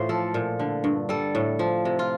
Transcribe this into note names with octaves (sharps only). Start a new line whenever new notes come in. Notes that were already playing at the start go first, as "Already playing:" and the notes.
Already playing: A2 E3 F4 C5
F3 A4
A#2
D3
G2
G3 A4
A2
F3
C3
F4